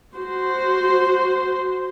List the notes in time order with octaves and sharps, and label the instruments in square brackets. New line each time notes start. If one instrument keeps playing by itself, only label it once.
[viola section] F#4 C5